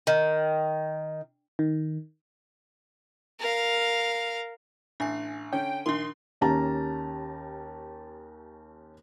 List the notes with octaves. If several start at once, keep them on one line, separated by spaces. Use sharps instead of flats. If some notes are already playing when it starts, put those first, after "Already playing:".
D#3
D#3
A#4 F5
A1 D4 G#5
D3 C#4 G5
A#1 D#3 D4 A#4 C6
D#2 C#4 G4 A5 A#5